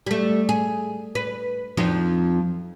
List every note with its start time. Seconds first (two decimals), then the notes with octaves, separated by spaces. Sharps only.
0.06 G3 A3
0.49 G#4
1.15 B4
1.77 F2 F3 D#4